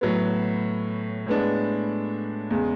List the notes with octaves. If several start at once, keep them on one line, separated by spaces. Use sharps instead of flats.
A2 F#3 B3
A2 G#3 B3 D4
E2 C#3 G#3